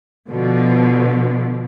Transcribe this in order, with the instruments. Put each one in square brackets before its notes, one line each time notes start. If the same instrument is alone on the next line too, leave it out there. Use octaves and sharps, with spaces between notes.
[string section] B2 D3 F3